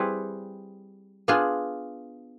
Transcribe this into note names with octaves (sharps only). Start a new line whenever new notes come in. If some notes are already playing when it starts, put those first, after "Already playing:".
Already playing: G3 C4 E4 G#4 B4
B3 D4 F4 G#4